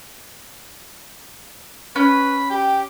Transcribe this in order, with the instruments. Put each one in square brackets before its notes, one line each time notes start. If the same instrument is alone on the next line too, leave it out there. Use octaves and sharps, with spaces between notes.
[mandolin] C#4 [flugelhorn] B4 [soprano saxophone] B5
[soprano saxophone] G4 [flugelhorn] G5